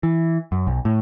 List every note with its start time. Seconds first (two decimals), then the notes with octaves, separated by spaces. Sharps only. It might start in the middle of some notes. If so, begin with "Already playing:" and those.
0.03 E3
0.52 F#2
0.67 B1
0.85 A2